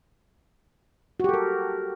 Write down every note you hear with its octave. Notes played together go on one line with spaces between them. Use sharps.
F#4 G4 A4 A#4